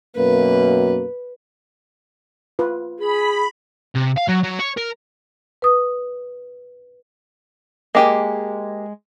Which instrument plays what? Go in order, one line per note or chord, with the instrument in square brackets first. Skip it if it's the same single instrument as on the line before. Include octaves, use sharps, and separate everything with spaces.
[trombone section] F#2 B2 A#3 [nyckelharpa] B4
[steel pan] F4 B4
[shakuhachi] G#4 [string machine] B5
[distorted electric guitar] C3
F5
F#3
F#3
C#5
A#4
[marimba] B4 D#6
[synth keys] G#3 [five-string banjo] A#3 G4 G#5